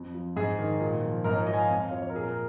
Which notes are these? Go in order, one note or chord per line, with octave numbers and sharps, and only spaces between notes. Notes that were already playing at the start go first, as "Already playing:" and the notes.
Already playing: F2 F3
F3
G#2 G#4
D#3
A#2
F3
G#2 A#4
C#5
F3 D#5
G#5
F5
F2 G#5
F5
F3 C#5
C#5
A#4
A#2 G#4
A#4